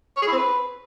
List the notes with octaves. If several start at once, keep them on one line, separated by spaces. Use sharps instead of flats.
C#5
G#4
E4
C4
B4